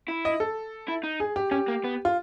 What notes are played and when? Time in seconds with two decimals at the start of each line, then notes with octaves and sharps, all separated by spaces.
0.08 E4
0.25 D#5
0.40 A4
0.88 E4
1.04 D#4
1.20 G#4
1.36 G4
1.51 C#4 G4
1.68 A#3
1.84 B3
2.05 F4